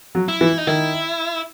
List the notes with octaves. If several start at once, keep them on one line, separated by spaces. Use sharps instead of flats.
F#3
E4
E3
D#4
D#3 E4